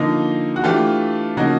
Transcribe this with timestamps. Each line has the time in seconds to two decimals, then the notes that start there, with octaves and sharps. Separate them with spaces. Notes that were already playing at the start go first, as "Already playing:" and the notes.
Already playing: D3 F3 A#3 D#4
0.56 F#4
0.64 E3 A3 D4 F4 G4
1.37 C#3 F3 A#3 D#4 F#4